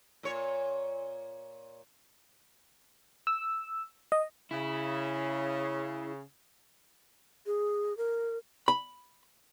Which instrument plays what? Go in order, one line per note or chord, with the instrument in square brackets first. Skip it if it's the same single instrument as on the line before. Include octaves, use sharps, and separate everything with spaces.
[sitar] A#2 C#5
[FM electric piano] E6
D#5
[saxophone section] C#3 [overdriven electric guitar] E4
[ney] G#4
A#4
[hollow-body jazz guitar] B5